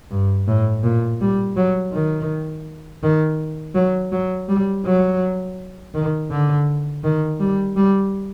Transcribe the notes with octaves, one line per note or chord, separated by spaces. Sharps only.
G2
A2
A#2
G3
F#3
D#3
D#3
F#3
F#3
G3
F#3
D#3
D3
D#3
G3
G3